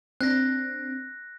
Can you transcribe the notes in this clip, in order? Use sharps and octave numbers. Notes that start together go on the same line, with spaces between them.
C4 D4 F#6 A#6